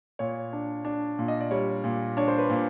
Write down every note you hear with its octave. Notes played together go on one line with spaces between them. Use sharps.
A#2 C#5
D4
D4
A#2
D#5
D5
G3 C#5
A#2
D4 C#5
C5
B4
A#2